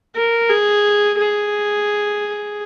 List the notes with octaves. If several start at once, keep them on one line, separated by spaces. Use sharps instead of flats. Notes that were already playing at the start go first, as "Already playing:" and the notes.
A#4
G#4
G#4